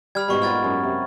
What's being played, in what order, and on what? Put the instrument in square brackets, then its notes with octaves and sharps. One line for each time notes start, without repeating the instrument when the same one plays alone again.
[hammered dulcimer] G3 [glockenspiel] B5 F6 G#6
[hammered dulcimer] G#2 B2 G3 [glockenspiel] B5 C#6
[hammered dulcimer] F4 A#4 F#5 [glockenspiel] F6 G#6 A6
[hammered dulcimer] F#2
C3